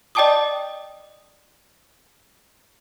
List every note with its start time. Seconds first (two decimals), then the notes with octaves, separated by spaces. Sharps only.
0.15 D5 D#5 G5 A5 D6 D#6